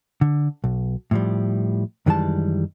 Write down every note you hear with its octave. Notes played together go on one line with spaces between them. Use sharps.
D3
B1
A2 F3 G3
F#2 D#3 E3 G3 G#3 A5